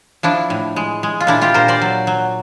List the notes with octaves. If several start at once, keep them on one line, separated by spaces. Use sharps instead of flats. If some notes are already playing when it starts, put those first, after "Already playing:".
F3 D4 E4
A2
G#3
G#3
F4
A#2 D4 E4
F4 G4
A#2 A#4 C5
C5 D5
F#3
F#3